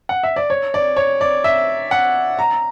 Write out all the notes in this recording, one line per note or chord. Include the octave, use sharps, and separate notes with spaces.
F#5
E5
D5
C#5
D5
C#5
D5
E5
F#5
A#5